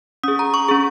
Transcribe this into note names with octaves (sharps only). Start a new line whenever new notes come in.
C#4 G#4 D#6
A#5
C#6
C#4 G#4 C#6